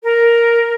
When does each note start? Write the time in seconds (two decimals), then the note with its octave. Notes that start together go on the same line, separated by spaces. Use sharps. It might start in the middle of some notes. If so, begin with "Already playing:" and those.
0.04 A#4